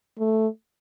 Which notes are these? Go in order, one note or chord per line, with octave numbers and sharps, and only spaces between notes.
A3